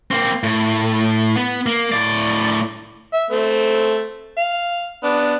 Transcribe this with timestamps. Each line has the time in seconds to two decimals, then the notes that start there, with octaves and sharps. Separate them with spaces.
0.11 A#3 C4
0.44 A2
1.36 B3
1.66 A#3
1.92 A2 D5
3.14 E5
3.30 A3 C4
4.38 F5
5.04 B3 D4